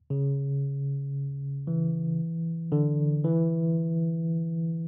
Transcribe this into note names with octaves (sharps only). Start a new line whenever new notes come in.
C#3
E3
D3
E3